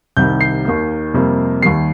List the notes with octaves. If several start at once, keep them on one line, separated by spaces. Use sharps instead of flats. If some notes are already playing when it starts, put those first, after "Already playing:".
C2 C3 D#3 G3 G6
C7
D#2 D#3 A#3
F2 C3 G3 A#3
D#2 D#3 G3 C7